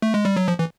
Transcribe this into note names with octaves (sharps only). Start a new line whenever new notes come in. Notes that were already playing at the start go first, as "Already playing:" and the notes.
A3
G#3
G3
F#3
F3
E3